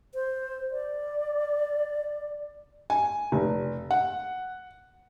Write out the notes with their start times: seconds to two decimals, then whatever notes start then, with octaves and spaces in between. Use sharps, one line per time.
0.15 C5
0.71 D5
2.90 G#5
3.32 F1
3.91 F#5